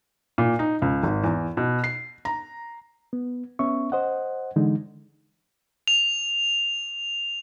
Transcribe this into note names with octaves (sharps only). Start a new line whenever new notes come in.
A#2
D#4
C#2
G#1
E2
B2
C7
A#5
B3
B3 C#4 E5 C#6
C5 D#5 F#5
D3 E3 G#3 D#4
F7